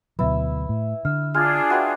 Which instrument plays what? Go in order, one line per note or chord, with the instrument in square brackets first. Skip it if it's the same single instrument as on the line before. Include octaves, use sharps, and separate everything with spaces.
[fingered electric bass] D2 B2 F#3 [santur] E4 [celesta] B4 E5
[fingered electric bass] A2
[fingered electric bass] D3 [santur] E5 [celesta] F6
[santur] G#3 [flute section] D4 F4 G#4 [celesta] F6 G#6 A6
[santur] F#4 B4 [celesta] E5 G5 E6